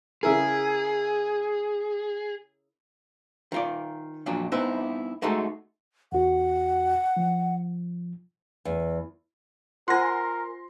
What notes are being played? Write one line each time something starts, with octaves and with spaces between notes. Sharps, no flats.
C#3 E4 G#4 A#4
D#3 F4 D5
F2 A#2 F#3 D4
G2 B3 C4 D#4 E4 E5
G#3 A3 D#4 F#4 A4
E2 F#4 F#5
F3
E2
F4 A#4 C5 F#5 G#5 C6 A#6